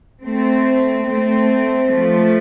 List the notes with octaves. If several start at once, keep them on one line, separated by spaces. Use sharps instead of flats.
A3 C4
A3 C4
F3 A3